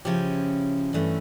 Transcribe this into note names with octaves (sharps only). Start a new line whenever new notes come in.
C#3 F3 C#4 E4 G4
G2 E3 A3 C#4